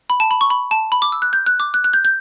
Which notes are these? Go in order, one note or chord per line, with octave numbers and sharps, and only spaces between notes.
B5
A5
B5
C#6
B5
A5
B5
D6
E6
F#6
G6
F#6
D6
F#6
F#6
G6
G6